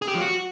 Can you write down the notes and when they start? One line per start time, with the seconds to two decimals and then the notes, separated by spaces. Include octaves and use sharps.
0.02 G#4
0.08 G4
0.14 F3
0.21 F#4